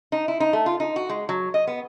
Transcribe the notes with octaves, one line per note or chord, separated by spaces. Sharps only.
D#4
E4
D#4
A3
F4
D#4
F#4
G#3
F#3
D#5
B3